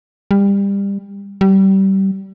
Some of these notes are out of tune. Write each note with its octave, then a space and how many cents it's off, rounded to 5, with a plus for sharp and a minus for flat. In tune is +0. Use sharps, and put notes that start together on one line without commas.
G3 +25
G3 -25